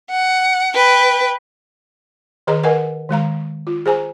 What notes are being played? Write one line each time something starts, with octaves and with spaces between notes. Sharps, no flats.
F#5
B4 G5
D#3 G#4 B4 D#5 A#5
A#4 B4 D#5 F#5 G#5
D#3 G#3 F5 A#5
F4
G#4 C5 G#5 A#5